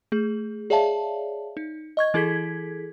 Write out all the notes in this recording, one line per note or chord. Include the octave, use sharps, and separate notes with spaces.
A3 G#4
G#4 C#5 D5 E5 F5 A5
D#4
D#5 C#6 G#6
E3 E4 G#4 A4 G#6 B6